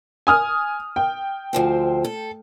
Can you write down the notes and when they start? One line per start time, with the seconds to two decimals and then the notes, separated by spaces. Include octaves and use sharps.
0.27 G#5 D#6 F6
0.96 G5
1.53 D2 F3 C4
2.04 A4